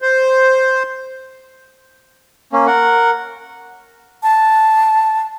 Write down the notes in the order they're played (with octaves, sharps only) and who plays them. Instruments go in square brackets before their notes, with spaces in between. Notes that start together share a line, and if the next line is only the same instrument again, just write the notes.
[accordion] C5
[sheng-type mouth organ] A#3 C#4
A#4 F#5
[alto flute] A5